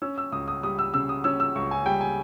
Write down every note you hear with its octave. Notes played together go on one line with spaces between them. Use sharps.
C#4 E6
E6
C#2 D#6
D#6
G3 D#6
E6
C#3 E6
D#6
C#4 E6
E6
C#2 C#6
G#5
G3 G5
G#5